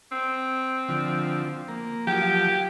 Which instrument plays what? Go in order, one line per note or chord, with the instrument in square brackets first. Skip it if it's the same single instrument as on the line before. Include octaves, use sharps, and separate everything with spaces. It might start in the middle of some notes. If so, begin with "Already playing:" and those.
[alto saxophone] C4
[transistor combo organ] D3 F3
A#3
[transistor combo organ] F3 F#3 [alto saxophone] G4